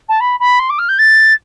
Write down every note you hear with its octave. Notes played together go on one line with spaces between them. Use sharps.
A5
B5
B5
C6
D6
F6
G6
A6